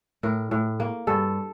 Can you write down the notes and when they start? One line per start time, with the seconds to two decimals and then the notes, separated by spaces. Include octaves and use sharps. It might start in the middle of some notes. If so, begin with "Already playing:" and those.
0.23 A2 A#4
0.51 A2
0.80 A#3
1.07 G2 A4